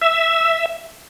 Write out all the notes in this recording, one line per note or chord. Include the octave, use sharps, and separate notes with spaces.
E5